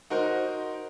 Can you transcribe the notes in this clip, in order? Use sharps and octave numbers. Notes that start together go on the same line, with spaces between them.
D#4 F#4 A#4 C5